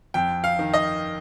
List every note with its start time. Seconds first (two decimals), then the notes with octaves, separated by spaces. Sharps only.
0.14 F2 G5
0.44 F5
0.59 D#3
0.73 D#5